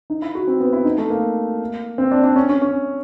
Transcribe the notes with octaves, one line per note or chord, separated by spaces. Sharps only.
D#4
E4
F#4
C4
B3
E4
D#4
A3
A#3
C4
D4
D4
C#4
C#4
C#4